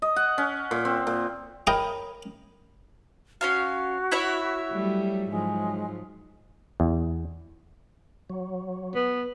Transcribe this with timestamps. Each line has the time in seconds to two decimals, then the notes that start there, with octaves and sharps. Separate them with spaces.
0.02 D#5
0.16 F#5
0.38 C#4
0.71 A#2
0.85 C4
1.07 A#2
1.67 A#4 C#5 D#5 G5 B5
3.41 C#4 F#4 C#5 F5
4.12 E4 C#5 E5
4.71 F#3 G3 A3
5.29 G#2 F3 F#3 G#3
6.80 E2
8.30 F#3
8.95 B3